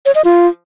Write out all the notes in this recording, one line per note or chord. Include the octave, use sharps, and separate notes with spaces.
C#5
D#5
F4